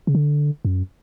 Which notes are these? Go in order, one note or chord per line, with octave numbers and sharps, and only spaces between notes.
C#3
D3
F#2